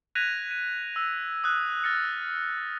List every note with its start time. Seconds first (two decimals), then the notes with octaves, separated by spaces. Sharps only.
0.15 F#6 G#6 A#6 B6 D#7 F7
0.51 D#7
0.96 E6
1.44 D#6 F#6
1.84 F6 A6 A#6 C#7